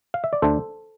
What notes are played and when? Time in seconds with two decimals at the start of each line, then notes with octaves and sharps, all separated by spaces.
0.14 F5
0.24 E5
0.33 D5
0.42 D2 D3 A3 D4 A4 C5